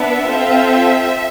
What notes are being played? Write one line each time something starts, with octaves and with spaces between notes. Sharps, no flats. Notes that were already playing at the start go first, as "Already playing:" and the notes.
Already playing: B3 D4 E5
C4 F4 A4